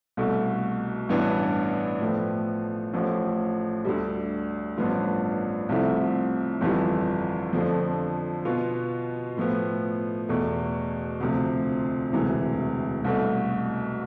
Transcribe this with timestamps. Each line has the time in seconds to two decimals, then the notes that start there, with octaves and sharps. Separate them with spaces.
0.17 C2 B2 A3
1.09 A1 G2 E3 B3 D4
2.01 A2 F3 B3
2.93 A1 A2 F3
3.85 D2 D3 G3
4.77 A1 G2 F3 B3 F4
5.69 C2 C3 F3 A3 E4
6.61 G1 F2 E3 G3
7.53 F2 D3 F3
8.45 B2 B3 F4
9.37 A2 F3 B3
10.29 E2 B2 A3
11.20 D2 C3 F3
12.12 E1 D2 C3 E3
13.04 C2 B2 A3